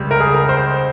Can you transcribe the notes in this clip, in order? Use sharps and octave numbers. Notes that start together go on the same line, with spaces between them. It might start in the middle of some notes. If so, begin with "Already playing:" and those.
Already playing: C#2 C#3 G3
A#4
G#4
A#4
C5